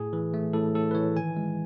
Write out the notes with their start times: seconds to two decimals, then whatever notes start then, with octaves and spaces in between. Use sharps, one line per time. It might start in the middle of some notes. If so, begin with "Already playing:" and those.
Already playing: A2 G#4
0.13 E3
0.34 A3
0.53 A2 A4
0.75 A2 A4
0.91 B4
0.95 E3 C#5
1.15 D#3 G#5
1.37 G#3